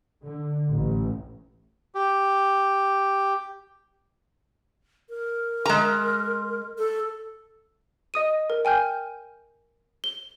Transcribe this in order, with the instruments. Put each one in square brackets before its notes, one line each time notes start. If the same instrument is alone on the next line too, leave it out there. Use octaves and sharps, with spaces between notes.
[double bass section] D3
A1
[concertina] G4
[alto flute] A#4
[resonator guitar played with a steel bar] G#3 A#5
[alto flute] A4
[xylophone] D#5 D#6 D#7
A#4
G5 G#5 F6 G6
G7